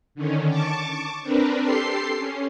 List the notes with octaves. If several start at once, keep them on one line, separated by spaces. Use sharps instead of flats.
D3 D#3 C#4
A5 C#6 D6
C4 D4 A#4 B4
G4 A4 C6 C7
C#4